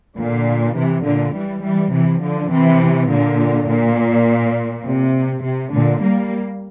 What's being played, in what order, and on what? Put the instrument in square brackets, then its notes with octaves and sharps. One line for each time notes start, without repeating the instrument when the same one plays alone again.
[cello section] A#2 D3
C3 E3
A#2 D3
E3 G3
E3 G3
C3 E3
D3 F3
C3 E3
A#2 D3
A#2
C3
C3
A#2 D3
G3 A#3